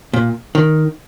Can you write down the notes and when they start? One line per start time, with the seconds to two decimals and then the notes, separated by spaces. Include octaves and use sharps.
0.14 A#2
0.55 D#3